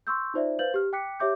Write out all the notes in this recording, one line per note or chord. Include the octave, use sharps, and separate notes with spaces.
C6 C#6 E6 G6
D#4 F4 C5 D5 E5
B4 C5 F5 G6 A6 F#7
G4 F6
G5 D6 F#6 B6 C#7
G4 C#5 E5 D6 G6